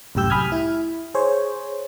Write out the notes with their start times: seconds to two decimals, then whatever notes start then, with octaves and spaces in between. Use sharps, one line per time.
0.15 C2 F#2 A2 G4 E6 G6
0.30 G#5 B5 D#6 F6 G#6
0.52 E4
1.14 G#4 C5 C#5